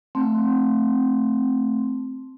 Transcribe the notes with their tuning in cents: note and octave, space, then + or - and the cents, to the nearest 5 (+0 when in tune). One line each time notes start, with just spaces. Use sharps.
A3 +0 C4 +0